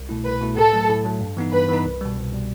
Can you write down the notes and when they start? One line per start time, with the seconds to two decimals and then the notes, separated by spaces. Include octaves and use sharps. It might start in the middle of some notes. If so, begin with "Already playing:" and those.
Already playing: C2
0.09 B2 A3 E4
0.25 C2 B4
0.41 B2 A3 E4
0.56 A2 A4
0.73 F#3 A3
0.89 A2
1.05 F#3 A3
1.21 G2
1.37 E3 B3 D#4
1.53 G2 B4
1.69 E3 B3 D#4
1.85 C2
2.01 B2 G3
2.17 C2
2.32 B2 G3